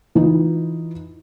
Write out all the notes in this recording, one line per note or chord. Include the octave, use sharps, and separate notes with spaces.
E3 D#4 F4